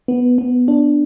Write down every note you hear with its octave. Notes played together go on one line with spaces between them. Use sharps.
B3
B3
D4